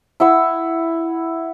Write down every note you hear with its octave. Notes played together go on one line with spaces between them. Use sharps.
E4 F#5 E6